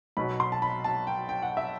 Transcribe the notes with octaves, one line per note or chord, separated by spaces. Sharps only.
B1 B2 F#3 B5
C6
A5
B5
A5
G5
G5
F#5
E5